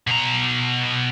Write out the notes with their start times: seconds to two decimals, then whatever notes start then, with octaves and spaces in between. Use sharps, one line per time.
0.07 B2 A#5